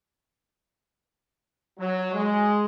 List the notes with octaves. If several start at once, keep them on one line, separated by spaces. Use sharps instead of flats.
F#3
G#3